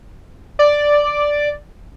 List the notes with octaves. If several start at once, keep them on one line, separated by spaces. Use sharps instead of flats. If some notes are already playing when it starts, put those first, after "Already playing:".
D5